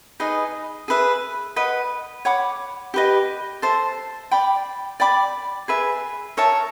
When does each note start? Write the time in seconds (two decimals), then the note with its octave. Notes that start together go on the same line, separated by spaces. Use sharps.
0.20 D#4 G#4 B4 D#5
0.88 G#4 B4 E5
1.56 B4 D#5 F#5
2.25 C#5 F#5 B5 D6
2.94 G4 B4 D#5
3.62 A4 C5 E5 A5
4.31 D5 G5 B5
5.00 D5 G5 B5 D6
5.68 G#4 B4 E5
6.37 A#4 C#5 E5 A5